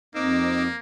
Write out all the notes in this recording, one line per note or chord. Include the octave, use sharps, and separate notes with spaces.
F2 A#3 C4 D#4 D6 E6